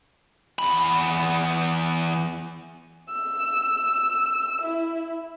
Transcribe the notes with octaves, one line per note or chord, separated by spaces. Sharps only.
E2 B5
E6
E4